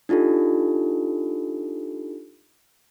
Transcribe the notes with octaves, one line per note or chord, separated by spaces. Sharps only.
D4 D#4 F4 G4 A4